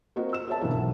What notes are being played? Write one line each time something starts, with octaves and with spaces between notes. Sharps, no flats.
A#3 C4 F4 F#4 C5 D#5
A#4 E6 E7
F#4 G#4 C5 C#5 E5 A5
B2 D3 E3 A#3
B1